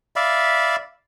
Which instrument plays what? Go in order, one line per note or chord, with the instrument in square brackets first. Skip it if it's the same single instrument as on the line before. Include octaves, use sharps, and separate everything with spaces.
[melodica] D5 E5 F5 B5